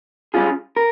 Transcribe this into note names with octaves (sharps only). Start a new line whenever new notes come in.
G3 C#4 F4 G#4
A#4